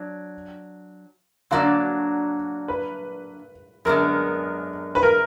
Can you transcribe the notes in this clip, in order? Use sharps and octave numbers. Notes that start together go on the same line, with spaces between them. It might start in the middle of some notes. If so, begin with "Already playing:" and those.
Already playing: F#3 D4
D3 F#3 A#3 D4 F#4
B4
F#2 D3 G#3 B3 A#4
B4
A#4